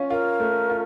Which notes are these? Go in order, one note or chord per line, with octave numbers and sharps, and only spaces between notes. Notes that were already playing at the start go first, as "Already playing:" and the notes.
Already playing: C#4 F4
F4 A#4
A3
F4